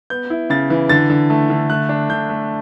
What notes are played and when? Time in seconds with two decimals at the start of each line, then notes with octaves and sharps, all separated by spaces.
0.10 B3 G6
0.30 E4
0.50 C#3 A6
0.70 E3
0.89 D3 A6
1.10 D3
1.30 A3
1.50 D3
1.70 A3 F#6
1.89 D4
2.10 D3 G6
2.29 A3